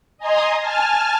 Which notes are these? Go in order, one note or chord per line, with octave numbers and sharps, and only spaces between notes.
D#5 G#5 A#5 C6 D#6
G#5 A5 F6